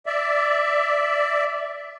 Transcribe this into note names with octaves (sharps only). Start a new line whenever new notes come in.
D5 E5